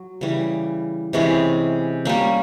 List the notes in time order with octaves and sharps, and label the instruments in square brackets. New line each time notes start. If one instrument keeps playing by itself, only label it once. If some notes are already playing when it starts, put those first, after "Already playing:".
Already playing: [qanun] F#3
C#3 E3 G3
C3 E3 G#3 C#4
G3 A#3 C#4